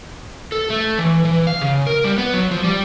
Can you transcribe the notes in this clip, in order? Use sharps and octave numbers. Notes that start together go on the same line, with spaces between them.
A4
A3
E3
E3
F5
C#3
A#4
G3
B3
F#3
F3
G3